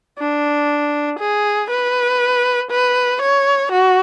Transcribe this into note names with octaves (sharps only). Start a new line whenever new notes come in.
D4
G#4
B4
B4
C#5
F#4